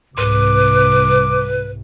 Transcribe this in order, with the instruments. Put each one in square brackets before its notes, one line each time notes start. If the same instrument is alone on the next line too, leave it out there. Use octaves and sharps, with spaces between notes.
[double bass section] C2 [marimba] G#2 [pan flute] B4 [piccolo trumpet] D6